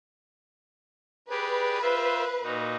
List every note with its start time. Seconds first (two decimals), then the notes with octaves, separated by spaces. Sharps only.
1.30 G4 G#4 B4 D5
1.82 F4 C5 E5
2.43 A#2 D#4 F#4